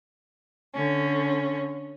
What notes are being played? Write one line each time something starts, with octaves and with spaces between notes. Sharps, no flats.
D3 C#4